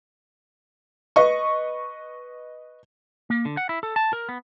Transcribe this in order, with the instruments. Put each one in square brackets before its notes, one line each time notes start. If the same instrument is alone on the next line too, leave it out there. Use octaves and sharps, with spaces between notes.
[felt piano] B4 D#5 C#6
[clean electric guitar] A#3
D3
F#5
E4
A4
A5
A#4
B3